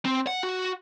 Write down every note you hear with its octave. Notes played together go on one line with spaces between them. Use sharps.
C4
F#5
F#4